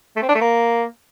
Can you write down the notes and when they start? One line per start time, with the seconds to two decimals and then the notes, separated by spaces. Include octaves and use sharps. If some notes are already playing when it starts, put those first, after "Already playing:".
0.16 A3
0.22 C4
0.29 D4
0.35 A3
0.41 A#3